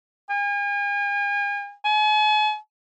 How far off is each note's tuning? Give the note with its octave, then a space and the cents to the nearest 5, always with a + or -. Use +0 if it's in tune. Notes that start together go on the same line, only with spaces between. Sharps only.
G#5 -40
G#5 +40